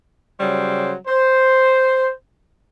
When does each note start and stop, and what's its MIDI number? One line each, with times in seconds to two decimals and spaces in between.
0.40 0.94 49
0.40 0.94 54
0.40 0.94 55
0.40 0.94 72
1.07 2.10 72